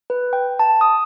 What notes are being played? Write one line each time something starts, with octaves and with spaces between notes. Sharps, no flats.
B4
G5
A5
D#6